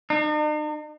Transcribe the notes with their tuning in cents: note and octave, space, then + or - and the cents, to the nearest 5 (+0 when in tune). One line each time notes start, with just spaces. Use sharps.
D#4 -45